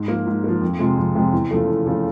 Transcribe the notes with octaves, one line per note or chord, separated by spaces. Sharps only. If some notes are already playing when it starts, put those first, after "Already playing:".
Already playing: G#2
F3 A#3
G#2
F3 A#3
F2
C3 F3 G#3
F2
C3 F3 G#3
E2
C#3 F3 A3
E2
C#3 F3 A3